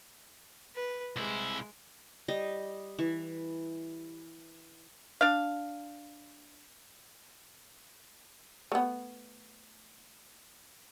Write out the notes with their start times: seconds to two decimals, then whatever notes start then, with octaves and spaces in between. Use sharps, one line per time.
0.75 B4
1.16 C2 G#3 E4
2.28 G3 D#5
2.99 E3
5.21 D4 F5
8.72 A3 B3